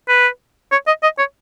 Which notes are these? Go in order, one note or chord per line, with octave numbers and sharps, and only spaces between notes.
B4
C#5
D#5
D#5
C#5